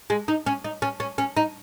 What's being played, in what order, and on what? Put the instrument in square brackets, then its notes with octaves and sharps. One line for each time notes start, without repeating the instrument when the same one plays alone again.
[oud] G#3
D#4
C#4
D#4
C#4
C#4
C#4
D#4